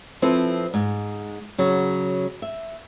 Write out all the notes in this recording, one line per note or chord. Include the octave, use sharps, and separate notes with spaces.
F3 C4 E4 A4 B4
G#2
C#3 F#3
E5